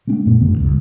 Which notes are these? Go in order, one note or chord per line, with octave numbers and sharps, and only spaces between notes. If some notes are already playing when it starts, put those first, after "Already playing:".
G#3 A3 C4 D4
F#2 A#2 A3 B3
F#2 D3 B3
E1 C#2 G2